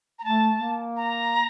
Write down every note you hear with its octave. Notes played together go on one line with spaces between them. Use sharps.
A#5
A3 A5
A#3
A#5